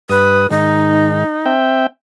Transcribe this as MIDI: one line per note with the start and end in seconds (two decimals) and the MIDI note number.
0.10 0.47 43
0.10 0.49 71
0.10 0.47 87
0.51 1.24 44
0.51 1.24 51
0.51 1.52 63
1.46 1.87 60
1.46 1.87 76
1.46 1.87 79